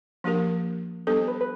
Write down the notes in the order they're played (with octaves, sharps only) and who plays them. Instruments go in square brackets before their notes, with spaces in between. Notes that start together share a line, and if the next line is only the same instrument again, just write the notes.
[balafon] F3 A#3 D4 G4 A#4
[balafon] G3 B3 D4 G4 C5 [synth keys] A4
[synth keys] B4
B4